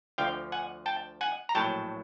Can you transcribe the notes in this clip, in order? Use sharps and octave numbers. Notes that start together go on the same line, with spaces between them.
D2 D3 F3 F5 G5
F#5 G#5
G5 A5
F#5 G#5
A#5
A#1 A2 F#3 G5 A5